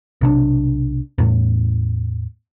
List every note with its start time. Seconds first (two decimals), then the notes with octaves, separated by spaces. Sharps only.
0.21 B1 C3 D4
1.18 E2 A2